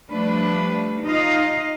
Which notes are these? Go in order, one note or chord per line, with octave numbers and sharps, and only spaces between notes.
F3 G3 A3 D4 B4
D#4 F4 D#5 F5